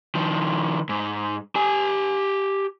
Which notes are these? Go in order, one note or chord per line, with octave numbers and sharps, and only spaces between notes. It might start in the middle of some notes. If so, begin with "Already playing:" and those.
D#3 F3
G#2
G4 G#5